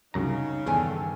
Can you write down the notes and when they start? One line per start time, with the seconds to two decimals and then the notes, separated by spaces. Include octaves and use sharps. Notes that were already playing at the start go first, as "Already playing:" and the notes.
0.14 C2 F#2 C#3 D#4 A#5
0.67 E2 G2 D#3 A4 G#5